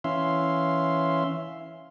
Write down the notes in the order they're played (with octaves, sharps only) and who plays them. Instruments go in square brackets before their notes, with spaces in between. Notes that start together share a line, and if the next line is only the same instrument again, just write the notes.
[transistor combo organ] E3 C#4 E5 F5 C6